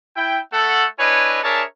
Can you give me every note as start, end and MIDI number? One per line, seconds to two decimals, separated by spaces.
0.16 0.39 64
0.16 0.39 79
0.53 0.86 57
0.53 0.86 69
0.53 0.86 78
0.99 1.43 62
0.99 1.43 64
0.99 1.43 71
0.99 1.43 73
0.99 1.43 75
0.99 1.43 80
1.43 1.63 62
1.43 1.63 68
1.43 1.63 70
1.43 1.63 73
1.43 1.63 76
1.43 1.63 81